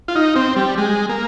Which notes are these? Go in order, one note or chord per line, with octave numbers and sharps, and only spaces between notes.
F4
D#4
C4
G3
G#3
A#3